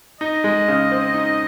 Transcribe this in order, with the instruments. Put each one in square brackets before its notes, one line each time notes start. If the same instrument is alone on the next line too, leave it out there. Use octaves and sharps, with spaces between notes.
[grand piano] D#4 [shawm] D#5
[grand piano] G#3
C#3
C4
D#4